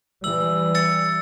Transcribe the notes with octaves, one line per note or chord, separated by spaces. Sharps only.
E3 G3 E6 F#7
E6 A6 C#7